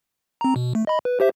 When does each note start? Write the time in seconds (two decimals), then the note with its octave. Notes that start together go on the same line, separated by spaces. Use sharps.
0.41 C4 A#5
0.56 B2
0.75 A3
0.87 D#5 B5
1.05 B4
1.20 G4 C5 E5